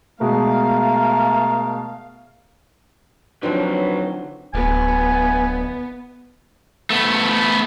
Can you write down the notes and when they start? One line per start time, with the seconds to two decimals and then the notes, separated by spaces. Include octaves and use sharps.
0.21 B2 G#3 A3 A#4 F5
3.43 F2 D3 D#3 F3 F#3 C4 B4 C#5
4.54 D1 B3 G#5
6.90 A3 B3